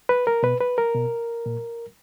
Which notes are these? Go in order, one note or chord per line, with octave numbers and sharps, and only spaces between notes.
B4
A#4
B2 B4
B4
A#4
B2
A#2